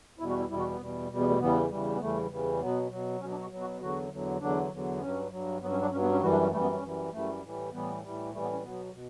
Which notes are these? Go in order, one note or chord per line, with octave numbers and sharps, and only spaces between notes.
E2 B2 G3 E4
F#4
E4
E2 B2 G3 E4
F#4
B3
E2 B2 G3
E2 B2 G3
B3
A3
E2 C#3 E3 G3 B3
E2 C#3 E3 G3
B3
E2 C#3 E3 G3 A3
E2 C#3 E3 G3
B2 F#3 B3
B2 F#3
B2 F#3 C#4
D4
F#4
B2 F#3
F#4
E2 D3 F#3 F#4
E2 D3 F#3
E2 D3 F#3 D4
E2 D3 F#3
B3
G2 F#3 C#4
G2 F#3
G2 F#3 B3
C#4
D4
G2 F#3 C#4
B3
C#4
F#2 E3 G3 F#4
D4
C#4
F#2 E3 G3 A3
B3
C#4
F#2 E3 G3
F#2 E3 G3 A3
A2 E3 G3
A2 E3 G3 B3
A2 E3 G3
A2 E3 G3 A3
B3
C#4
B2 F#3 B3
B2